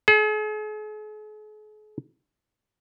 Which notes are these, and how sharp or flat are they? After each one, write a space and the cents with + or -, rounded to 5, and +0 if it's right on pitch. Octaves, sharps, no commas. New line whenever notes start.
G#4 +45